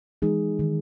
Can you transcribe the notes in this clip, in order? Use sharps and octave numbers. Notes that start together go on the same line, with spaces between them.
E3 G#3 D#4 G#4
D#3